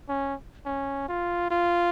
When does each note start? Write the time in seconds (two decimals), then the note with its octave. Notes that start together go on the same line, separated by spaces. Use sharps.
0.09 C#4
0.66 C#4
1.09 F4
1.51 F4